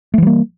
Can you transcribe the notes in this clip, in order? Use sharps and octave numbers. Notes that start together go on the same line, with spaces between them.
E3 G3 A3 A#3